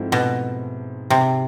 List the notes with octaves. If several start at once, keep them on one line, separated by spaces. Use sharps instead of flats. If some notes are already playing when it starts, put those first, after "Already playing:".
Already playing: G#2 F3 A3 C4 E4
B2
C3